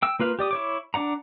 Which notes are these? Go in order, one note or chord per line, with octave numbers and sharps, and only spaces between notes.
G5 E6
A#3 F4 B4 F5
G4 D5 D#6
E4 C#5 D6
D4 D5 F#5 A#5